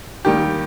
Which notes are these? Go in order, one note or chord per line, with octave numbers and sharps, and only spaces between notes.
D#2 D#3 G3 G4